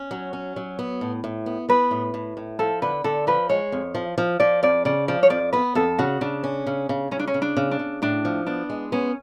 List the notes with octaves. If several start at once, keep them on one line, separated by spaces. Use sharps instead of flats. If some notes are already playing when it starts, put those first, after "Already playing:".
Already playing: C#4
F#3
C#4
F#3
B3
A2
A2
B3
B3 B4
A2
A2
A2
F3 A4
D3 B4
D3 A4
F3 B4
G#3 C#5
F2
F3
F3
F3 D5
F2 D5
C#3 D5
F3 D5
C#5
F2 D5
B3 B4
F2 A4
C#3 F#4
C#3 D4
C#4
C#3
C#3
C#3 C#4
D4
C#4
C#3
D4
C#3
D4
C#3
A2 D4
F3
B3 D4
G#3
B3 C#4